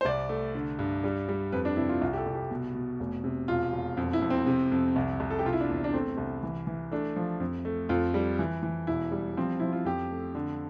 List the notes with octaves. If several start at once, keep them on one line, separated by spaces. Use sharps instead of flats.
C5
C2 D5
A3
D3
G2
G3
G3
F2 B4
D4
C3 E4
F4
C2 F4
G4
A4
C2
G4
B2
B2
F1
C3
E1 F4
E1
F2
E4
F2
C4
C3
F2
C2
C2
A4
G4
C3 F4
E4
D4
E2
D4
A3 C4
C2
E3
E3
A3 D4
F3
F2
A3
F2 F4
G3
E3
E3
E1 E4
G3
F3 C4
F3 E4
F4
F2 G4
A3
D3